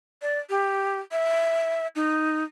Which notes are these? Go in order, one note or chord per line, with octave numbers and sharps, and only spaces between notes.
D5
G4
E5
D#4